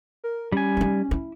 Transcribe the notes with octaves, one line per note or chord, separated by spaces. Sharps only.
A#4
G3 C#4 G#5
D#4 F4
E4